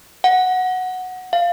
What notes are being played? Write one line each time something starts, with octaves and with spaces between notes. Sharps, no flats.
F#5
F5